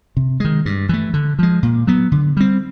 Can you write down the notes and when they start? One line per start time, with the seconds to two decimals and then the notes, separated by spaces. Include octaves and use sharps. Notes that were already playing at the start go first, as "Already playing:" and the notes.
0.17 C3
0.40 D#3 G#3
0.66 G2
0.89 E3 A3
1.14 D3
1.39 F3 G#3
1.63 A#2
1.87 F#3 B3
2.12 D3
2.37 G3 C4